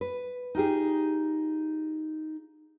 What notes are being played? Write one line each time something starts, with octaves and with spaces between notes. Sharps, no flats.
B4
D#4 F4 G4 G#4